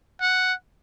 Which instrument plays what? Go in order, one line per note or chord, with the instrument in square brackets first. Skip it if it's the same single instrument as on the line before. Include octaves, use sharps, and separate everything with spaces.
[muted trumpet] F#5